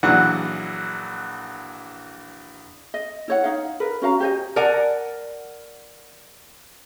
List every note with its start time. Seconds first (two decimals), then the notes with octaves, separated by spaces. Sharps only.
0.03 A#1 E3 F#3 F#5
2.94 D#5
3.28 E4 C#5 F#5
3.42 D#4 F5 F#5
3.80 A#4 B4
4.02 C#4 F#4 F5 A#5
4.20 G4 C5 D#5 G#5
4.56 A#4 D5 F#5 G#5